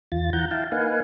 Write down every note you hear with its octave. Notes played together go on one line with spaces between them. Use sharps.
E2 F4 A6
E3 F#5 A#5 G6
E4 F5 G5 A5
A#3 D#4 B4 F5 F#5 G#5